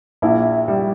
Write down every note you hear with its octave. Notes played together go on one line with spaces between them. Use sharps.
A#1 E4
G3